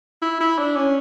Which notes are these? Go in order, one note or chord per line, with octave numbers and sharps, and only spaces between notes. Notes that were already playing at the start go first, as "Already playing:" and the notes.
E4
E4
D4
C#4